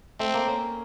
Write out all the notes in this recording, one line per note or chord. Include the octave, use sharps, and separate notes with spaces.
A3 C4
A#3
C#4